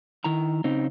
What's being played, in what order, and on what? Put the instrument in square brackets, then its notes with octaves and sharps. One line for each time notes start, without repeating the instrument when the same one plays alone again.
[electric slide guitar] D#3 E4 A#5
C#3 C4 D#4